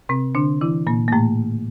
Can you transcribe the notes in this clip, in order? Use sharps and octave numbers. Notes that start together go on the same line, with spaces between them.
C3 C4
D3 D4
E3 E4
A#2 A#3
A#3
A2 A3